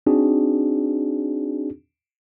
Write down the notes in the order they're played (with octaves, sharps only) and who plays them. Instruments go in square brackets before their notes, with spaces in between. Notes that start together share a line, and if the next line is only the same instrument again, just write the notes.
[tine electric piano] C4 D4 D#4 F#4 G#4